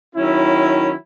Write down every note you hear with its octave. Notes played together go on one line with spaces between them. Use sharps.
D#3 F#3 C#4 E4